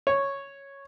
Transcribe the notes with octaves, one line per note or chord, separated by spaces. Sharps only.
C#5